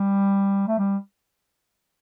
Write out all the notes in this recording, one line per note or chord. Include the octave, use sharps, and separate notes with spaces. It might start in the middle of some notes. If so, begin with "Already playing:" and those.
Already playing: G3
A3
G3